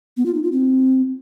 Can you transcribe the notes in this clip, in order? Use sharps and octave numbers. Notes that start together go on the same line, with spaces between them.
B3
F4
D#4
F4
C4